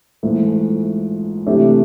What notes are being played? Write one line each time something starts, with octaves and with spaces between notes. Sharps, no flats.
A#1 G#2 E3 A3
C3 E3 A3 D4 G4